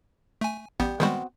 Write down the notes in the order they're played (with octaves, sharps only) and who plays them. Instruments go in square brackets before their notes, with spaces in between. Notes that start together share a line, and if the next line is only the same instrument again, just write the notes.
[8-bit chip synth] A3 G#5
[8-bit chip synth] A1 B3 [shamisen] G3
[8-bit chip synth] D#3 G3 G#3 [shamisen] B3 C4 F#4